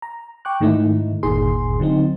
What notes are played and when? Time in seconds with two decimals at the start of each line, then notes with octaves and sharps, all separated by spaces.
0.02 A#5
0.45 G5 C#6 D6 F#6
0.60 G#2 D#3 A3 D#4 E4
1.23 G1 D#2 A#2 D#3 G#4 C6
1.80 D3 F#3 C4 D#4